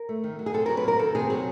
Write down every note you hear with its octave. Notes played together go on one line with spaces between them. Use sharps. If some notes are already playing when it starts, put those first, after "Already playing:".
Already playing: A#4
A3
D#3
F#3
G#4
C3 A4
F#3 A#4
B4
A#3 A#4
D#3 A4
C3 G#4
F#3 G#4